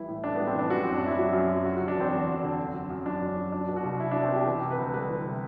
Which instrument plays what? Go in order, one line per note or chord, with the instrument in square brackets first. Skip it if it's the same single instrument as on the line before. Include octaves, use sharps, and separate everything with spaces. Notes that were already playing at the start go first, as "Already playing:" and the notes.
Already playing: [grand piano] E3 G3 E4
A2
A2 D4
B3
G3
C4
E3 D4
F#2 F#4
F#3 C4
D4
F#2 E4
F#3 F#4
F#2
F#3
F#3 F#4
D3 F#4
D4
E2 C4
E2
F#3
D3
F#2
F#3
F#2
F#3 D4
F#2
F#3
F#3 D4
B2
F#4
C2
C2 E4
F#3 D4
C4
B2
G4
E3
C3
B4
D2
G3 B4
E3
C3